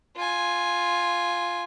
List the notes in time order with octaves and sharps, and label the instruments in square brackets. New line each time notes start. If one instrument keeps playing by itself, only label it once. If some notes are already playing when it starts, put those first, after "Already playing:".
[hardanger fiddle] F4 G#5